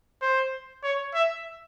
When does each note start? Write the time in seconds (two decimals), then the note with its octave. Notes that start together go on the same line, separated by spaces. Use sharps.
0.22 C5
0.83 C#5
1.14 E5